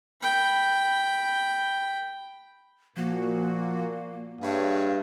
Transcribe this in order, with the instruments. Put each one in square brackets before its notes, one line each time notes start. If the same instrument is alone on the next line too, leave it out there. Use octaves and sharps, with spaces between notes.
[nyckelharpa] G5 B5
[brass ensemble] A#2 [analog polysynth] F3 F#4 [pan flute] A#3
[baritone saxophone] G2 [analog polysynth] G#4 B4 C#5 [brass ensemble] E5 F5